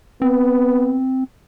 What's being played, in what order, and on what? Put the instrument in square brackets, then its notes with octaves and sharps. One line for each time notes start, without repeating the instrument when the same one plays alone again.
[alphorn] B3 [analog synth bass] C4